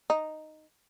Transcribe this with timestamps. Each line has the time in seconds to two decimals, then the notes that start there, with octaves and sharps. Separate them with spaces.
0.10 D#4